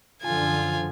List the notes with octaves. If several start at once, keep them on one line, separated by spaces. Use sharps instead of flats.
F#2 D3 F3 F4 G#5